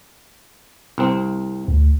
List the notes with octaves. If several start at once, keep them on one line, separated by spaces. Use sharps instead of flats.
C2 C4
D2